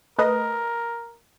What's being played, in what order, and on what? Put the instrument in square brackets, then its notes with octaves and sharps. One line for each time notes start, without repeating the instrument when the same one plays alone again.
[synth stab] A3 B4 D#5 [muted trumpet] A#4